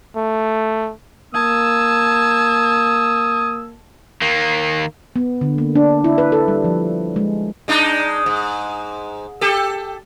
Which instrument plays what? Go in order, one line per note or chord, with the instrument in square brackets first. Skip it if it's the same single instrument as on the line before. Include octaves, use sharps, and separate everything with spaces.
[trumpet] A3
[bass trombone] A#3 [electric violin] A5 G#6 [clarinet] D#6 [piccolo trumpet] E6
[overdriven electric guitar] D#3 A#3
[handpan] B3
D3
A#3
D4
E4
B4
A4
G3
F3
G#3
[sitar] G#3 D4 D#4
G#2
G4 A4